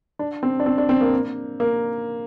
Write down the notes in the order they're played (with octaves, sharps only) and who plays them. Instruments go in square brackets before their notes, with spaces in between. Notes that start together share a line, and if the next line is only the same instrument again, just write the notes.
[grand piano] D4
C4
D4
C4
D4
C4
A#3
A#3